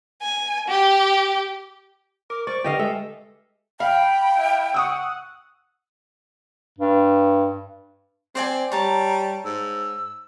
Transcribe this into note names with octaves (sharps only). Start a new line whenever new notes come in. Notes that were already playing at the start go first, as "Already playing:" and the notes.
G#5
G4
A#4 D6
C5 D5 C#6
D3 G4 B4 D#5 F5
G#3 A4 E5
F5 G5 B5
E4
F#5 C#6 D#6 E6
G2
C4 C5 D5 G#5
G3 C#5 A5 A#5
G#2 E6